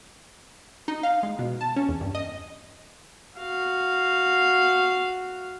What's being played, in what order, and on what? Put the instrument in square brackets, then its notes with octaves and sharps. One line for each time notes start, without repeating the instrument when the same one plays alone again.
[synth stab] D#4
F5
G#3
B2
A5
C#4
E2
G2
D#5
[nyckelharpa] F#4 F5